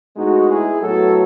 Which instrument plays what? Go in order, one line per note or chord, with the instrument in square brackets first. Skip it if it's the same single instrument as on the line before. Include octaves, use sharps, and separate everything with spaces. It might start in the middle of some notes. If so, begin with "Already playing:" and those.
[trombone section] A2 G#3 B3 D#4 F#4
E4 G#4
A2 F#3 B3 F#4 A4